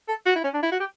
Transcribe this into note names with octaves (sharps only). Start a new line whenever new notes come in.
A4
F#4
E4
C#4
D4
E4
F#4
G4